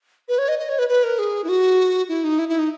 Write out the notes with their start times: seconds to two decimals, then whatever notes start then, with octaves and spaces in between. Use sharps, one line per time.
0.29 B4
0.38 C#5
0.48 D#5
0.59 D#5
0.69 C#5
0.79 B4
0.89 B4
1.04 A#4
1.19 G#4
1.44 E4
1.49 F#4
2.09 E4
2.24 D#4
2.39 E4
2.49 E4
2.59 D#4